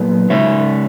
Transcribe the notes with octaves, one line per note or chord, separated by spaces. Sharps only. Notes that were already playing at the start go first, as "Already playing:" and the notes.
Already playing: A#2 F#3 B3 D#4
C#3 G#3 D#4 C#5 E5